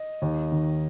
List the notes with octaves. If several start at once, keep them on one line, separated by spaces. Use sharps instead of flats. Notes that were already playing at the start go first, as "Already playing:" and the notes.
Already playing: D#5
D#2
D#3